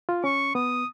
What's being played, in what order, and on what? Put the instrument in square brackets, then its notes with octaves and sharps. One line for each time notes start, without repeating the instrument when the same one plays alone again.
[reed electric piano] F4
[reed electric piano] C#4 [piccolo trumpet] C#6
[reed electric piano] B3 [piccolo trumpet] D#6